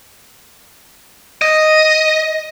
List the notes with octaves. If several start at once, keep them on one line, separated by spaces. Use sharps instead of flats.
D#5